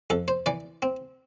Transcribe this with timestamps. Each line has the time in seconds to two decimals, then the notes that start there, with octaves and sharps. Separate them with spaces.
0.10 F2 A4
0.28 C5
0.46 E3 D5
0.82 C4